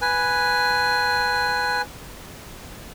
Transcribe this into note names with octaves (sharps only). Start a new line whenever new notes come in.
B4 G#5